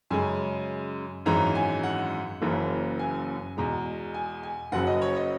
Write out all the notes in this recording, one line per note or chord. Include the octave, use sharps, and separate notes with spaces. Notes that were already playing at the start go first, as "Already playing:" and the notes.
F#2 C#3 G#3 G#5
G#1 F#2 E3 G#3 A#5
G#5
F#5
F#1 F#2 C#3 E3 A#3
G#5
E2 B2 G#3 A#5
G#5
G#5
F#1 F#2 C#3 F#3 F#5
D#5
C#5
D#5